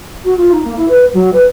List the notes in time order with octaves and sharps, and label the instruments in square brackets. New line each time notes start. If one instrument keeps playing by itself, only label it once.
[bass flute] F#4
F4
D#4
A#3
E4
B4
F#3
B4